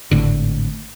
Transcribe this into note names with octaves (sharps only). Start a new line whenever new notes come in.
G#1 A2 D3